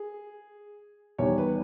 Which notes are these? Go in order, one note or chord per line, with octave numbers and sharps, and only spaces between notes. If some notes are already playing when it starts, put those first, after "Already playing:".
Already playing: G#4
E2 D#3 G3 C#5
B4